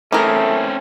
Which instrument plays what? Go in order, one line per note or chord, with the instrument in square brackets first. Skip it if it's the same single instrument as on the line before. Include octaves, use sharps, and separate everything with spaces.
[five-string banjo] E3 G#4 A#4 [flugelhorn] A3 [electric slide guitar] C4 C#4